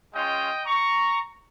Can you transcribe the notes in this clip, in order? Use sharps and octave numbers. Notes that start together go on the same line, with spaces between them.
G#3 C#4 F4 D#5 G5
A#5 C#6